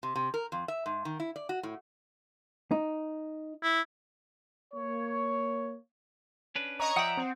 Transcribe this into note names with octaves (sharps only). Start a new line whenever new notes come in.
C3
C3
A#4
F2
E5
G#2
D#3
E4
D5
F#4
A2
D#4
E4
A#3 C#5
C#4 D4 B4
C#5 D#5 A#5 C#6
F3 D5 E5 F#5 G5 D#6
C4